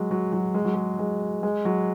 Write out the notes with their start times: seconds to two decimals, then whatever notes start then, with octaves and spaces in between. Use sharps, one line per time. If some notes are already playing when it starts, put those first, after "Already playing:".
Already playing: F#3 G#3
0.11 F#3
0.33 F#3
0.54 G#3
0.65 F#3
0.74 G#3
0.99 G#3
1.43 G#3
1.65 F#3